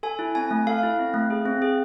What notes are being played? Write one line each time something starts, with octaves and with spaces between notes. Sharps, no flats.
A4 G#5
E4
C4 G#5
A3
A4 F5
E4
C4
A3
G#4
C4
G#4